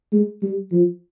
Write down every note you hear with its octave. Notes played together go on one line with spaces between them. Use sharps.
G#3
G3
F3